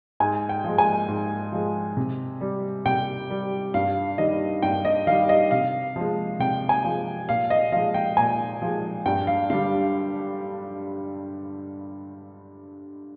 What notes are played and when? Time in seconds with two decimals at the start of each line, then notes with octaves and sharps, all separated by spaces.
0.20 G#2 G#5
0.49 G5
0.64 F3 G#3
0.78 G#5
1.08 G#2
1.52 F3 G#3
1.97 C3
2.41 G3
2.85 C3 G5
3.30 G3
3.74 G2 F5
4.18 D#3 G3 D#5
4.62 G2 G5
4.85 D#5
5.07 D#3 G3 F5
5.29 D#5
5.51 C3 F5
5.96 F3 G#3
6.39 C3 G5
6.69 G#5
6.84 F3 G#3
7.28 A#2 F5
7.50 D#5
7.72 F3 G#3 F5
7.94 G5
8.17 A#2 G#5
8.62 F3 G#3
9.06 G2 G5
9.27 F5
9.50 D3 G3 F5